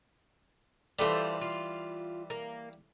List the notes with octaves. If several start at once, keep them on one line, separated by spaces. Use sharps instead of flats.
E3 G3 A3 F4 C5
F4
A#3